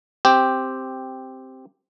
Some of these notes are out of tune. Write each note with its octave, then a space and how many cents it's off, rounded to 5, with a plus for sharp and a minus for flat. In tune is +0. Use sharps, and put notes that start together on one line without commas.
C4 +0 G4 +0